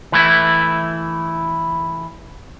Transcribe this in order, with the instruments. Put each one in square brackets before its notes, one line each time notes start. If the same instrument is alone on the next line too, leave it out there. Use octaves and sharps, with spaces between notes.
[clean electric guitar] E3 A3 E4